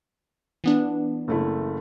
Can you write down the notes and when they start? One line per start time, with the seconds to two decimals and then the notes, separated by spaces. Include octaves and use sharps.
0.64 E3 B3 D4
1.28 F#1 A3 E4